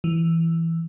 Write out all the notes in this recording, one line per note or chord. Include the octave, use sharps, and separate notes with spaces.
E3